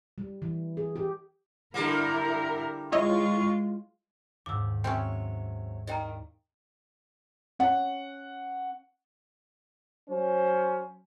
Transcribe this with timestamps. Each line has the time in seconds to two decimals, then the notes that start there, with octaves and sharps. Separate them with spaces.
0.18 G3
0.42 E3
0.77 G#4
0.96 G4
1.74 D3 G3 A#3 E4 A#4
2.92 G#3 E4 F4 C#5 D#5 C#6
4.46 D#2 G#2 D6 E6
4.84 C3 F#3 C4 C#4 C#5 G5
5.87 D#3 G3 D#5 G5 A#5
7.59 C#4 F#5
10.10 F#3 C#4 C5